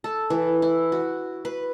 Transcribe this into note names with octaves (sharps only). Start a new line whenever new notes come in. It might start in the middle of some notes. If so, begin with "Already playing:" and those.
A4
E3
E4
F#4
B4